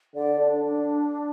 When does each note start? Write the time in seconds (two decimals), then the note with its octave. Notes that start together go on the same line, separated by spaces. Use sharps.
0.15 D3 D5
0.40 D4
0.64 D4